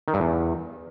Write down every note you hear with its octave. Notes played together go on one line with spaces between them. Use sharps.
D#3
G2
E2